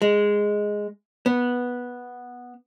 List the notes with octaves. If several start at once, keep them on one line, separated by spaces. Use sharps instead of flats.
G#3
B3